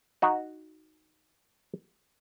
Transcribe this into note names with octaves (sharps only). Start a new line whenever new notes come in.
D#4 F#4